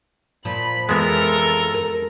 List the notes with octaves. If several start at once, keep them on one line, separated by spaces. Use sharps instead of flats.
A#2 F3 B5
F2 E3 G#3 B3 A4 A#4 E5
A#4